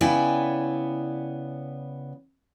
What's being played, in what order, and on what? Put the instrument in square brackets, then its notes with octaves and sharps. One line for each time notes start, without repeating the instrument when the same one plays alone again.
[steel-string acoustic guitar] C#3 B3 E4 D5 G5 G#5